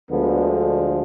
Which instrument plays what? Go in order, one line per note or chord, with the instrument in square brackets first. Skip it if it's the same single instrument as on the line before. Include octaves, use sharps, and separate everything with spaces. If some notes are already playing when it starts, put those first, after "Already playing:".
[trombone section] D2 D3 F3 G#3 B3